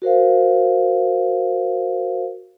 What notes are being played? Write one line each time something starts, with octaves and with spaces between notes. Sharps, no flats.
F#4 A#4 C5 F5